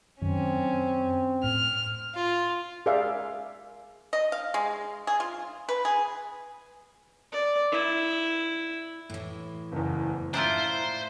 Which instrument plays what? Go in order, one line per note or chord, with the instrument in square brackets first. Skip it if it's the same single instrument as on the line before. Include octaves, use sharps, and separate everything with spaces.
[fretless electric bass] F#2 D#3 [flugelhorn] C4 [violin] C#4
[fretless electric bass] A2 [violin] F6
[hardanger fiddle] F4
[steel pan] G#4 A#4 D5 E5 F5
[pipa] D#5
F5
G#3
G#4
F4
B4
G#4
[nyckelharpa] D5
E4
[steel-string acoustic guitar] A2 E3
[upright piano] F#1 E2
[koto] D4 E4 F4 [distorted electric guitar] C5 [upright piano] A#5